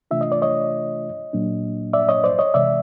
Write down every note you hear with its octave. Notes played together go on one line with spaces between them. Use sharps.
C3 E3 A3 D4 F4 E5
D#5
D5
C#5 D#5
A#2 F#3 A#3 D4
D5 E5
C#5 D#5
C5 D5
C#5 D#5
C3 E3 G#3 D5 E5